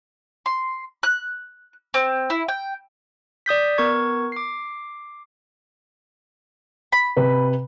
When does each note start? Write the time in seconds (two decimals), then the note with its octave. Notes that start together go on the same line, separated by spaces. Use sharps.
0.46 C6
1.03 F#6
1.94 C4
2.30 E4
2.48 G5
3.46 D5 D#6 G6 B6
3.78 B3 A#4 C#6 G#6
4.32 D6 C7
6.92 B5
7.17 C3 B4